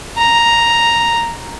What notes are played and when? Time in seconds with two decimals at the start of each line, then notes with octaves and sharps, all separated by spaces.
0.17 A#5